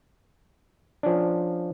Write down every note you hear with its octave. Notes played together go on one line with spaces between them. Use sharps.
F3 C#4 D4